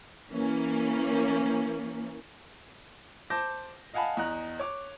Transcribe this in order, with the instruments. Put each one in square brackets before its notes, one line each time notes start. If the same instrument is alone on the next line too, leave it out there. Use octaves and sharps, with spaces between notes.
[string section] E3 A#3 C#4
[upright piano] C5 A5 D6 G6 A#6
D#5 F5 F#5 G#5 A5 B5
E2 D#5 A#5 F#6
C#5 D6